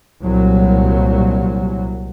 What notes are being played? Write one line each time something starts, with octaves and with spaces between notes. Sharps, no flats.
C2 A#2 F#3